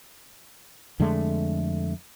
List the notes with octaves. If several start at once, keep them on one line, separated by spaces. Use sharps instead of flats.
F2 D3 G#3 A3